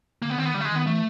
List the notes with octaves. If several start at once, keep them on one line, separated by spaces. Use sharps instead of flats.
D3 A#3
B3
D#3 C4
B3
D3 G3
A3
G#3
D#3 B3
E3 A3